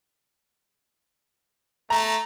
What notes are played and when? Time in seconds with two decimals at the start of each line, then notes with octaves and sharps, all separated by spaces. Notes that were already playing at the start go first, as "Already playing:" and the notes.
1.90 A3 A#5